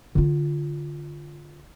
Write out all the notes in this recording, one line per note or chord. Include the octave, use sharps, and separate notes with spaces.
D3 F4